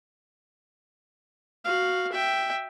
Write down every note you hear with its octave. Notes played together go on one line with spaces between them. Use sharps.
F#4 F5
E5 G5